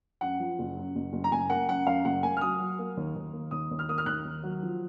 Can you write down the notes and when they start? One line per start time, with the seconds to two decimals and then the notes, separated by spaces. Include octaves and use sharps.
0.21 F#2 F#5
0.39 F3
0.59 F#1
0.77 F#2
0.95 F#1
1.13 F#1
1.24 A#5
1.31 F#1 G#5
1.50 A#3 F#5
1.68 F#2 F#5
1.87 F#2 F5
2.05 F#1 F#5
2.23 A#3 G#5
2.37 F6
2.41 F#3 D#6
2.59 F#3
2.79 A#3
2.97 D#2
3.15 D#2
3.33 A#3
3.51 D#2 D#6
3.71 D#2
3.79 F6
3.89 A#3 D#6
3.98 F6
4.06 D#2 F#6
4.25 D#2
4.43 F#3
4.62 F3